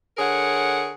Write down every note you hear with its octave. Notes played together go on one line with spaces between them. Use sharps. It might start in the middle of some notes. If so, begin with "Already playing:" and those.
D3 G#4 A#4 C#5 F#5